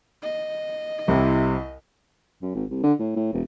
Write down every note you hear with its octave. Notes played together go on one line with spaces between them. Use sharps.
D#5
C2 C3 E4
F#2
G#1
C2
D3
A2
A2
E1